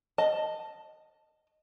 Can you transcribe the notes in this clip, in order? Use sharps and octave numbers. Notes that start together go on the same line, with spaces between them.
D#5 A5